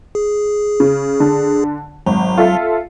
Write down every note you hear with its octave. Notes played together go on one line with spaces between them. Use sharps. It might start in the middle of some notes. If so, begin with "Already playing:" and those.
G#4
C#3
D3
G#1 F#3
F4 A4 E5